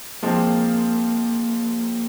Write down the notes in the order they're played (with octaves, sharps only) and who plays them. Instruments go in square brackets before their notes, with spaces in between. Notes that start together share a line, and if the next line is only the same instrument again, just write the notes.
[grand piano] F3 G#3 C4 [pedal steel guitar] A#3